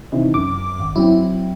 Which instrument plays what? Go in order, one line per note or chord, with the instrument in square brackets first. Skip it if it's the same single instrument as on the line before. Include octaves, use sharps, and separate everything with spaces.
[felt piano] C3 D#3 E3
[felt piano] F#2 [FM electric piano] D6
[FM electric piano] G#1
[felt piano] F#3 C4 [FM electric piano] E4